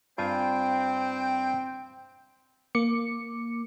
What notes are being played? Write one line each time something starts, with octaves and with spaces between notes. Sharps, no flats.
G2 C4 F4 G5 G#5
A#3 D6 C#7